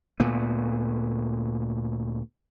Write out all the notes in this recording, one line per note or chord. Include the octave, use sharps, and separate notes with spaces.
D2 A#2 A3 B3